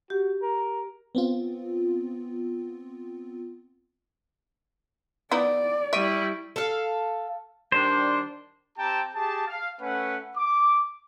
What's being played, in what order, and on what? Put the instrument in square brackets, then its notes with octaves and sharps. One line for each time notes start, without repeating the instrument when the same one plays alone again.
[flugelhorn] F#4 [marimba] G4
[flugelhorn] A#4
[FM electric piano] B3 C4 F4
[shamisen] B3 D#4 E4 [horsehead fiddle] D5
[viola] G3 E4 [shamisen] E5 [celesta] C#6 D7 D#7
[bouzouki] A4 F5
[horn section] D#3 G3 D4 [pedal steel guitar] C5
[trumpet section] C4 G4 G5 A5 A#5
G4 G#4 A5
F5
A3 C#4 B4 F#5
D6